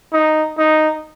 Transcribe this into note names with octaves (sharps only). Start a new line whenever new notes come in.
D#4
D#4